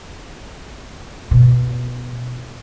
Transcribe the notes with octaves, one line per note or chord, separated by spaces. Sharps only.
B2